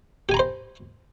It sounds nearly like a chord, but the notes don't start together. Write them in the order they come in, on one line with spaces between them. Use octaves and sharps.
G4 G#5 A#5 B5 C5